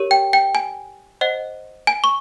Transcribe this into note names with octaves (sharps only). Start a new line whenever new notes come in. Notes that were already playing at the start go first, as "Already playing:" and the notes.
Already playing: G4 A#4 C#5
G5
G5
G#5
C5 D#5 F#5
G#5
C#6